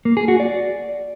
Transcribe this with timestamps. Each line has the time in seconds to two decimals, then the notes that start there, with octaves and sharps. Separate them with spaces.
0.05 A#3
0.17 G#4
0.28 F#4
0.40 D5